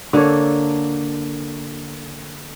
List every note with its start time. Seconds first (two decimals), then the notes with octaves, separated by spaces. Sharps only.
0.13 D3 A#3 A4 C#5